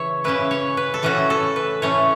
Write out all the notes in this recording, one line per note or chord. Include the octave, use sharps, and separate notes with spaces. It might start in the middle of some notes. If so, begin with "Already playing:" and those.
Already playing: C#3 E3 C#5 E5
C#3 E3 C#4 E4 B4
C#5
B4
A4
A2 E3 A3 C#4 F#4
A4
B4
A2 E3 A3 C#4 C#5